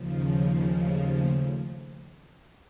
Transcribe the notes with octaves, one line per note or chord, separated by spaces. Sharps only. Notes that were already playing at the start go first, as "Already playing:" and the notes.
Already playing: D#2 C#3 F3
A3
A3